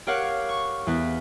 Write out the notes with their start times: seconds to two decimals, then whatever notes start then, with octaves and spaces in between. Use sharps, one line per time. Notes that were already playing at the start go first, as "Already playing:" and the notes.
0.07 G4 A#4 C#5 F5 F#5
0.49 C#6
0.87 E2 B3